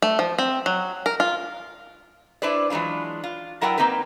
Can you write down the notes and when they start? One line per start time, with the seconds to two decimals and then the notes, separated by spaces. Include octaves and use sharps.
0.02 A3
0.19 F3
0.38 C4
0.66 F#3
1.06 A#4
1.20 F4
2.42 D4 E4 B4 C5 D5
2.70 E3 F#3 G#3 D4 F4
3.24 F4
3.61 F#3 E4 A#4 D5 F#5 G5
3.77 A#3 C4 D#4 A#4 B4